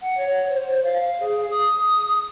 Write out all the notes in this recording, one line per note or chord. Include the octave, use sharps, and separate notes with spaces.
F#5
C#5
C5
F5
G#4
D#6